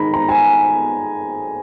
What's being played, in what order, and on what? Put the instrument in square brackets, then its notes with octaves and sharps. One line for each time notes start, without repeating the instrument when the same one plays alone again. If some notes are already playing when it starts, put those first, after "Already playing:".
Already playing: [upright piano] D#3 G#3 A#5 B5
A#5
G#5